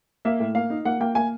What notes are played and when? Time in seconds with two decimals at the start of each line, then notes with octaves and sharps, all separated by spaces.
0.25 A#3 E5
0.40 A2
0.55 A#3 F5
0.70 D#4
0.85 A#3 F#5
1.00 A#3 G5
1.15 A#3 G#5